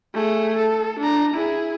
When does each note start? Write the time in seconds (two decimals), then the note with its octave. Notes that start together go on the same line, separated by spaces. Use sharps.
0.14 A3 G#4
0.56 A4
0.99 D4 A#5
1.34 E4 G#4